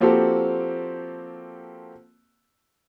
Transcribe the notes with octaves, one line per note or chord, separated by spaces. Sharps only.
F3 A#3 C4 F#4 G4 A4